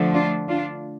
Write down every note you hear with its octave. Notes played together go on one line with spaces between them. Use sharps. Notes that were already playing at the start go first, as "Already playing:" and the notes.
Already playing: D3 F3 A3
D4 F4
D4 F4